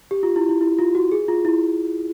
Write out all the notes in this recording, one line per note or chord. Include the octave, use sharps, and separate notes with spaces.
G4
F4
E4
E4
E4
F4
F#4
G#4
F4
E4